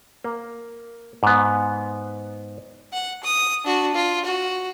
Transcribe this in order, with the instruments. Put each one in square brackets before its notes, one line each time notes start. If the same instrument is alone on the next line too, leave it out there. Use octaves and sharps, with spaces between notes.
[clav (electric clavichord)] A#3
G#2 B3
[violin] F#5
D#6
D4 F#4
F4
F#4